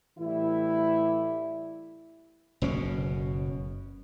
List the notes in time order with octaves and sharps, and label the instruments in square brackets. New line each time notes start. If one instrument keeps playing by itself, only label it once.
[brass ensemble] A2 E3 G3 E4
[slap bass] F#1 B2 C#4